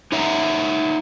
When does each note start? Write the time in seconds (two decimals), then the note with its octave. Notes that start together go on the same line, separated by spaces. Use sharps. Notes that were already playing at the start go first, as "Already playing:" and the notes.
0.12 D#4 C#5 E5 F#5 A5 A#5